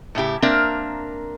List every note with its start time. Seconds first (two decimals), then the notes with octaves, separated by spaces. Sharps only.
0.15 A2 C#3 E4 G4
0.42 A#3 C4 D4 A#4 E5